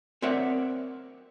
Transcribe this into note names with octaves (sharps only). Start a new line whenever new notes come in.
C4 A#4 C#5 D5 E5 F#5